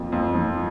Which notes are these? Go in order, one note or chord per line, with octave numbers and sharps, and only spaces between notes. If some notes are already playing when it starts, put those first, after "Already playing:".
Already playing: F2 F3 A#3
F2
F3